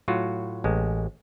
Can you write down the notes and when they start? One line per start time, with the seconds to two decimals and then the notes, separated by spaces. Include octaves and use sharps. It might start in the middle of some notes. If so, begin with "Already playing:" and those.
0.08 A2 F#3 F4 F#4
0.64 A1 G#3